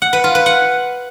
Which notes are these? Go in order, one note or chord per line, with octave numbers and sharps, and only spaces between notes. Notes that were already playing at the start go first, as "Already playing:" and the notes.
F#5
B4
F4
B4
F#5